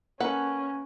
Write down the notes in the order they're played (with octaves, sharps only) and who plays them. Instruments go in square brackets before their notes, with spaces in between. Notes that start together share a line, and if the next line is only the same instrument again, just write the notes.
[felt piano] A#3 [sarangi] C#4 [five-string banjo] A4 B4 F#5